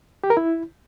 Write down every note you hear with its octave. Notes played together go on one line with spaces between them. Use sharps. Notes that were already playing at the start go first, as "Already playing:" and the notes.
G4
A#4
E4